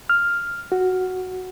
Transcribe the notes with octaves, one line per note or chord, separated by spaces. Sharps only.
F6
F#4